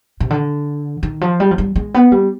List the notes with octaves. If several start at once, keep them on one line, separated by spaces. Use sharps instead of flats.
C3
D3
D#3
F3
G3
F3
G3
G#3
B3
G3